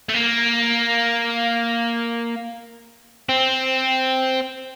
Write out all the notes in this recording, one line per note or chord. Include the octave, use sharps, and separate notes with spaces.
A3
A#3
C4